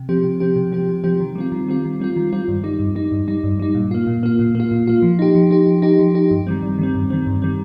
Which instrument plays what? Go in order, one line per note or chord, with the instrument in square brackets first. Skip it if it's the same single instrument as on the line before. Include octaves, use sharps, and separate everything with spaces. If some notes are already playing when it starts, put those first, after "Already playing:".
Already playing: [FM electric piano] C3
F3 C4 G4
C3
F3 C4 G4
C3
F3 C4 G4
C3
F3 C4 G4
D#3
G3 C4 F4
D#3
G3 C4 F4
D#3
G3 C4 F4
D#3
G3 C4 F4
G2
G3 D#4
G2
G3 D#4
G2
G3 D#4
G2
G3 D#4
A#2
A#3 F4
A#2
A#3 F4
A#2
A#3 F4
A#2
A#3 F4
F3
D#4 G4
F3
D#4 G4
F3
D#4 G4
F3
D#4 G4
G2
D#3 G3 C4
G2
D#3 G3 C4
G2
D#3 G3 C4
G2
D#3 G3 C4